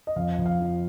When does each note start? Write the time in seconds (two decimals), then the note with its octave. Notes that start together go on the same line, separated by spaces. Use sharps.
0.07 D#5
0.16 F2 F5
0.38 F2
0.46 F5
0.60 F3